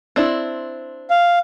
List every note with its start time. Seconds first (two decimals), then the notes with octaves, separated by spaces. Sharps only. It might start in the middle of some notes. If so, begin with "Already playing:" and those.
0.16 C4 D4 E4
1.10 F5